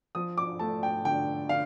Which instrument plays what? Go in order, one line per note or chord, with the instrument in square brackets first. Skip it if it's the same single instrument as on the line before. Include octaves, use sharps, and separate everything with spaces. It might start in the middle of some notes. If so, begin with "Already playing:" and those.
[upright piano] F3 D#6
D6
A3 A5
G5
D3 G5
D3 F5